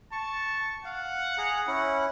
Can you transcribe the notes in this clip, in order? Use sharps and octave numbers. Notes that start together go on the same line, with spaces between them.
A5 C#6
F5 F#5
G#4 A#5
C#4 E4 F#5